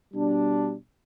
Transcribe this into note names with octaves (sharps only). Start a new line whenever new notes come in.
B2 G3 D4